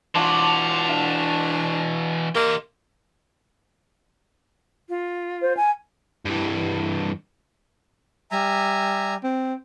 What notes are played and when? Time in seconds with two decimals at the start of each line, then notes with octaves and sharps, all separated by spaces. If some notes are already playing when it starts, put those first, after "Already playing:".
0.15 E3 D4 F4 F#4 A5 C6
0.89 D4 F5 F#5
2.35 A#3 G4 D#5 C6
4.89 F4
5.42 C5
5.57 G#5
6.25 G2 E3
8.31 G3 E5 G#5 A#5
9.24 C4